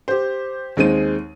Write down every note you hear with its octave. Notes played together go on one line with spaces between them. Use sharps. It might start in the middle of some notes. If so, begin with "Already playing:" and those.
G4 C5
D#2 G#3 C4 D#4 D#7